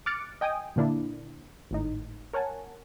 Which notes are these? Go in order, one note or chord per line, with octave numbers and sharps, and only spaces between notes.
D6 F6 F#6 A6 C#7 D7
D#5 G5 G#5 D#6
A#2 D3 A#3 D4 E4
G#1 A2 D#4
A#4 C#5 F#5 G#5 A5